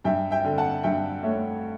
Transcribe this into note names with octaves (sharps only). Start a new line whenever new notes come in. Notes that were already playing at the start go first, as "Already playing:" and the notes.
G2 E5 G5
E5 G5
D3
F#5 A5
G2 E5 G5
A3 C#5 E5